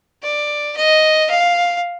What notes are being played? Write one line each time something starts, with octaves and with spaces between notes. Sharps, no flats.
D5
D#5
F5